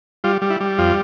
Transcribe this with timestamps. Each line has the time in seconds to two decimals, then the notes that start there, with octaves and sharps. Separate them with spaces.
0.24 G3 F4
0.42 G3
0.50 E4
0.61 G3
0.78 F2 F4